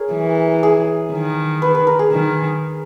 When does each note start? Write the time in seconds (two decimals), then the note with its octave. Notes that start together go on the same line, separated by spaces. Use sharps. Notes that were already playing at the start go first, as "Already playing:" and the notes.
Already playing: G#4 A#4 C#5
0.13 E3
0.63 G#4
1.12 D#3
1.62 B4
1.75 B4
1.87 A#4
1.99 G#4
2.11 D#3